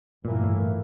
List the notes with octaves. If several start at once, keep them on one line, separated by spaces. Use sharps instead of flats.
G1 G2 A#2 E3 A#3
A2